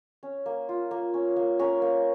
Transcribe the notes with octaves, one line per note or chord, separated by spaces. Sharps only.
C#4
A#3
F4
A#3
C#4
A#3
C#4 A#4
A#3